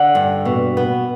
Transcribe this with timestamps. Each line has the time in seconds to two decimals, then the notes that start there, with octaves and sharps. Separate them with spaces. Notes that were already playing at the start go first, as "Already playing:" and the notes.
Already playing: D3 F#5
0.15 G2
0.45 B2
0.77 B3